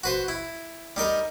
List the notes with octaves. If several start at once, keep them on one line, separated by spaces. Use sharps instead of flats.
F#4 B4 C5
E4
G3 D#4 A#4 D#5